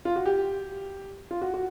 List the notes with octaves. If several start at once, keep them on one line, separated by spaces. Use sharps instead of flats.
F4
F#4
G4
F4
F#4
F#4